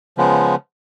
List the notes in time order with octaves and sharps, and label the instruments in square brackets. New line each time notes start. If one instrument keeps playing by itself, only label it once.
[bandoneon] C#3 F3 G#3 B3